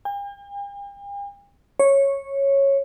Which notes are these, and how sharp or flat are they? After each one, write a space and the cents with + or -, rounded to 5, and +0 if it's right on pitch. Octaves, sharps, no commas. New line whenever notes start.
G5 +45
C#5 -10